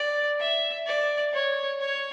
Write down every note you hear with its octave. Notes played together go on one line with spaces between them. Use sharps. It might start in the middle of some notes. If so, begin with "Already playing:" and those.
Already playing: D5
E5
D5
C#5
C#5